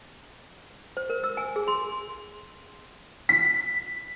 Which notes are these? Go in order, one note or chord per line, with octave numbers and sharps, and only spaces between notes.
C5
A#4
E6
G#5
G#4
C6
B6